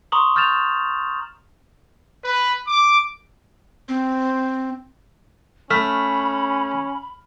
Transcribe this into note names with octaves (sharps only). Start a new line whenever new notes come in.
A#5 C6 C#6 D#6 F#7
C#6 F6 G6 A6 E7 F7
B4
D6
C4
A3 C#4 B5 F6 B6